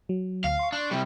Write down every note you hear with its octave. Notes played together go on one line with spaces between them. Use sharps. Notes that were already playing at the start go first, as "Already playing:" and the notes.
F#3
D2 F5
C6 C#6
D4
C3 G3